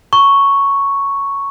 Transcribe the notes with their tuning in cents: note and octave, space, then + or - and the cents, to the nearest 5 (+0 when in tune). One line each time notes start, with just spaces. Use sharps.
A#5 -15 C#6 +0